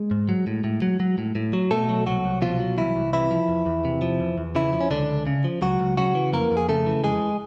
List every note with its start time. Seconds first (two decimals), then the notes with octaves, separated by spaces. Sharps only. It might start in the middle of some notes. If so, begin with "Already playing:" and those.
Already playing: G#3
0.11 G#2
0.29 F#3
0.47 A2
0.64 A2
0.82 F#3
1.00 F#3
1.18 A2
1.35 A2
1.53 F#3
1.71 B2 A3 A4
1.89 F#3
2.06 C2 F#3 F#4
2.24 C2
2.42 B2 F3 F4
2.60 F#3
2.77 C2 E3 E4
2.96 C2
3.13 C3 E3 E4
3.31 F3
3.48 E2
3.66 E2
3.85 C3
4.02 F3
4.20 E2
4.38 E2
4.55 C#3 E3 E4
4.73 F3
4.81 C#4
4.91 C#2 D3 D4
5.09 C#2
5.27 C#3
5.44 F3
5.62 C#2 F#3 F#4
5.80 C#2
5.97 C#3 F#3 F#4
6.15 E3
6.33 F2 A#3 A#4
6.51 F2
6.57 G#4
6.68 C#3 A3 A4
6.86 E3
7.04 F2 G#3 G#4